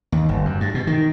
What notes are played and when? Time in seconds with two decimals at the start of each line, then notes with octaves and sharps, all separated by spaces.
0.12 D#2
0.29 G1
0.45 F#2
0.61 G2
0.74 B2
0.87 D#3